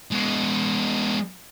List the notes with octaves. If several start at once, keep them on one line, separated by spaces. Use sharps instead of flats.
G#3 B3